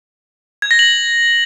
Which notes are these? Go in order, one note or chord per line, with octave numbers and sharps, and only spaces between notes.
G#6
A#6
F#7